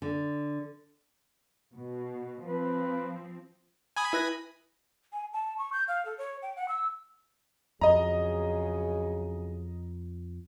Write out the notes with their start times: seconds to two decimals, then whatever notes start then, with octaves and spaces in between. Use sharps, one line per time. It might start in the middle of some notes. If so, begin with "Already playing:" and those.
0.02 D3
1.74 B2
2.45 F3 C4 B4
3.96 G#5 B5 D#6 G#6
4.13 E4 B4 A#6
5.13 G#5
5.33 A5
5.58 C#6
5.73 G6
5.88 F5
6.05 A4
6.18 C#5
6.42 G5
6.56 F#5
6.68 E6
7.81 F2 C#3 F#3 G#4 D#5 A#5